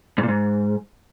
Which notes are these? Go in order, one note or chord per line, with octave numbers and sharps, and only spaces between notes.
G#2
A#2
G#2